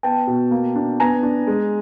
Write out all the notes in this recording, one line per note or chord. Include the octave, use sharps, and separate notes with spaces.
B3 G5 A5
B2
A#3
D4
B3 G#5 A#5
D4
G#3